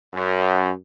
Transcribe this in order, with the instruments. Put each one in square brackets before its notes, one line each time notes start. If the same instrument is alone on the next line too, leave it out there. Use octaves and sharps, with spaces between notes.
[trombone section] F#2